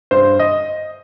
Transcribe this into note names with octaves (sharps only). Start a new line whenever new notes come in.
G2 C5
D#5